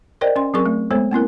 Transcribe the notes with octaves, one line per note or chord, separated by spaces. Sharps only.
A#4 C5 D5 D#5 G5
C#4 C6
F#3 C4 G#4 A#4 C#6
A3
G#3 B3 A4 C5 C#5
A#3 C4 E4 A#4